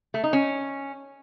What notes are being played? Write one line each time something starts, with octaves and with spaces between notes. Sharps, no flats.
A3
D#4
C#4